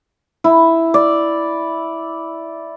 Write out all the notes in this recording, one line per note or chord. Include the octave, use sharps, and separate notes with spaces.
E4
D5